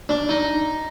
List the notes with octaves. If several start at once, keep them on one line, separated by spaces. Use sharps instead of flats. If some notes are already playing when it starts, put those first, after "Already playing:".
D4
D#4